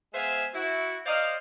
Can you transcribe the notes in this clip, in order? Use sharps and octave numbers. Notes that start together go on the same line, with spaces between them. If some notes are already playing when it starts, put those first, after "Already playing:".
G#3 B3 C5 E5 F5 G#5
E4 F#4
C5 D5 D#5 F5